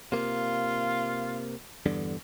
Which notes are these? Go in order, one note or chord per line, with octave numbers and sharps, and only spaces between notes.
C3 A#3 F4
E2 G2 D3